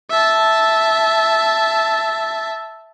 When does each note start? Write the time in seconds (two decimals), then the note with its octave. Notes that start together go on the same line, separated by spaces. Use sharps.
0.10 E5 A5